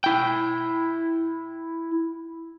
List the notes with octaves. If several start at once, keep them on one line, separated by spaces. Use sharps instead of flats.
E4 G5